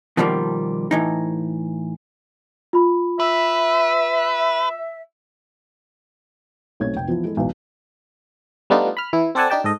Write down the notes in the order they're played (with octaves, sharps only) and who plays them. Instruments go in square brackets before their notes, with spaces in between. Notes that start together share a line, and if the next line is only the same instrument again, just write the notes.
[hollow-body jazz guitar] B2 D#3 F3 G3 A3 A#3
A2 E3 D#4
[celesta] F4 B5
[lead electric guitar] B4 [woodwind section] E5
[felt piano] B1 A3 C4 C#5 G#6
F1 G5
E3 F3 B3
G#3 E4 A4
B1 E2
[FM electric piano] G3 A3 B3 D4 D#4 F4
B5 F6
E3 E4
C4 A4 D5 F#5 G#5 A5
D4 D#4 G4 G5 A5
G#2 A4 D#5